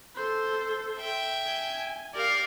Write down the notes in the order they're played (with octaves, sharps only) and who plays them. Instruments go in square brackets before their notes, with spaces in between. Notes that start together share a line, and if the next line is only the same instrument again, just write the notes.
[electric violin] A4 C5
[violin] E5 G5
[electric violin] G#5
[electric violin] G4 D5 [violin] A#4 F5